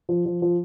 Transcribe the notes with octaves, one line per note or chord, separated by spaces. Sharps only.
F3
F3
F3